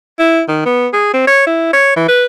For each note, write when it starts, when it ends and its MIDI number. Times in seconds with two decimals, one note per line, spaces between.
0.19 0.41 64
0.48 0.63 51
0.66 0.88 59
0.93 1.10 68
1.13 1.23 60
1.27 1.42 73
1.47 1.68 64
1.73 1.93 73
1.96 2.04 52
2.08 2.25 71